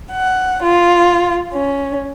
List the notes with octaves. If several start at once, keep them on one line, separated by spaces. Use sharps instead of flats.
F#5
F4
C#4